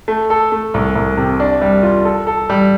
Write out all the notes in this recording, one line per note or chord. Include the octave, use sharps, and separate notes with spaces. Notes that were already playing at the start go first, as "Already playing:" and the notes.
A3
A4
A3
C2
C2
C3
D4
G3
F4
A4
A4
G3